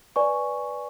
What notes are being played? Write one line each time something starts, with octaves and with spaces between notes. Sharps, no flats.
B4 D5 G#5 C#6